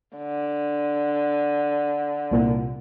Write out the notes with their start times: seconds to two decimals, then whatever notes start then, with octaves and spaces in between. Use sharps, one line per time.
0.17 D3
2.31 C2 A#2